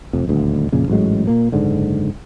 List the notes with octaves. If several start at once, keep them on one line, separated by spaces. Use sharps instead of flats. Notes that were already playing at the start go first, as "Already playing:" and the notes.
F1 F2
D#1 D2
F2 A#2 C#3
A1 G#2 F#3 G#3
A#2 A#3
F#1 G#2 D3